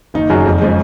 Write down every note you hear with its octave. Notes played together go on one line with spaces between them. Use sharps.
F#1 D#3 D#4
F#2 C#3 F#3
F2
C#3 F3 G#3